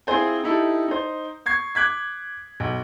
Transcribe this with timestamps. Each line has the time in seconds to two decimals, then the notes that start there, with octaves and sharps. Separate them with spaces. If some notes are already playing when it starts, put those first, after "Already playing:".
0.07 C4 E4 F4 G#4 C5 G#5
0.44 D#4 E4 G4 A4
0.88 D#4 C5
1.46 C#6 G#6 C7
1.75 D6 F#6 G#6 B6
2.60 B1